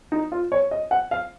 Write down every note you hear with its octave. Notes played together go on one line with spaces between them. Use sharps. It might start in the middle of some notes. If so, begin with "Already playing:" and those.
D#4
F4
C#5
D#5
F#5
F5